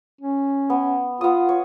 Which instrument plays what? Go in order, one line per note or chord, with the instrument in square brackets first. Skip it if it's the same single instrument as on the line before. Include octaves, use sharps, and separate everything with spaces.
[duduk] C#4
[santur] B3
[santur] B3 D#6 [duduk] F4
[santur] C#5